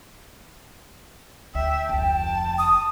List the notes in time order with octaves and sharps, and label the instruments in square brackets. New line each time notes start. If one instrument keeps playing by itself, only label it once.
[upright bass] D2 [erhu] E5 [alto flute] G5
[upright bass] F1 D2 [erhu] A5
[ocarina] D#6